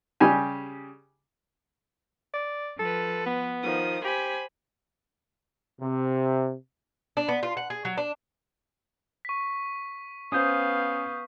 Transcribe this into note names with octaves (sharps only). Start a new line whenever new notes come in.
C#3 G3 G4 G#5
D5
F3 A4 B4
B3
D#3 F3 D#6
G4 C5 G#5 B5
C3
D4
B3
F4
F#5
G#4
F#3
D4
C#6 B6
B3 C#4 C5 F5 D#6 G6